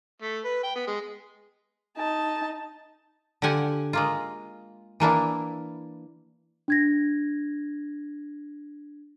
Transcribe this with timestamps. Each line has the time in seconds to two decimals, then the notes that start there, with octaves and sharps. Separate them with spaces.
0.22 A3
0.44 B4
0.64 G5
0.76 B3
0.87 G#3
1.97 D#4 A5
3.42 D3 F4 G4 F#5 G#5
3.93 G#3 A#3 F4
5.00 E3 A#3 D4 E4
6.68 D4 G#6 A#6